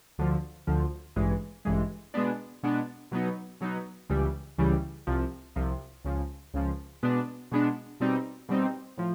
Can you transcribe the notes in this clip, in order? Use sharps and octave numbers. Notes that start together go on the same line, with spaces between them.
D2 D3 F3
D2 D3 F3
A1 G2 E3 G#3
A1 G2 E3 G#3
B2 G#3 B3 D4
B2 G#3 B3 D4
B2 F#3 B3 D#4
B2 F#3 B3 D#4
C#2 C#3 E3 G3
C#2 C#3 E3 G3
C2 C3 F3
C2 C3 F3
C#2 C#3 F3
C#2 C#3 F3
B2 G#3 B3 D4
B2 G#3 B3 D4
B2 G3 C4 D#4
B2 G3 C4 D#4
A2 F3